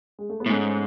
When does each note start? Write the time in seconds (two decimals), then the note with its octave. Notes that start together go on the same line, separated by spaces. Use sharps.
0.19 G#3
0.30 A3
0.40 B3
0.46 A2
0.49 G#2 A3 C#4